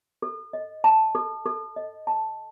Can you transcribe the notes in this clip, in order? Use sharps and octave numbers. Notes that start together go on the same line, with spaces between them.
A4
D#5
A5
A4
A4
D#5
A5